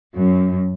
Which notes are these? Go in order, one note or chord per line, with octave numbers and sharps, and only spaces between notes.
F#2